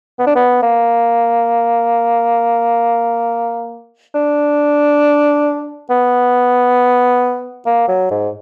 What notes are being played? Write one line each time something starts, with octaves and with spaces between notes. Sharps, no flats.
B3
D4
B3
A#3
D4
B3
A#3
F#3
G#2